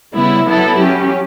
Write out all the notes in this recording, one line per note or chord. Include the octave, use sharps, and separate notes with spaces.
C#3 G3 B3 E4
F#3 B3 E4 A4
F#3 C#4 G4